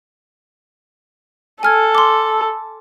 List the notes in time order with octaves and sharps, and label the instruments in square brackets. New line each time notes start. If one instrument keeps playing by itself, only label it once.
[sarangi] A4 [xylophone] G#5 F6 G#6
[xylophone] C6 D6